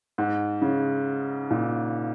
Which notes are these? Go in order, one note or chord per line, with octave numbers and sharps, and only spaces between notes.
G#2
C#3
A#2